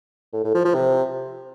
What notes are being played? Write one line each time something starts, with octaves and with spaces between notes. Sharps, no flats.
A2
A2
F3
F3
C3